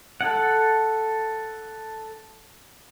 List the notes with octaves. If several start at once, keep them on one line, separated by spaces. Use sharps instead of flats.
A4 F#5